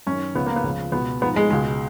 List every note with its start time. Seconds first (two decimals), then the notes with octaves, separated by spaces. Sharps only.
0.07 F#2 C#4
0.11 D#3
0.35 C#2 C#3 F3 B3
0.46 A#3
0.56 B3
0.64 C#2 C#3 F3
0.92 C#2 B2 B3
1.21 G#2 F3 B3
1.36 G#3
1.50 C#2 B2 G#3